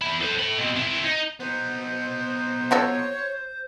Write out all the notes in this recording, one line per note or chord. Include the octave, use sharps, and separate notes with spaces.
E2 E4
A4 C5
A4 B5
B2 C4
C4 E4
D#4
B3 D#4 C5
F4 F#4 A4 C#5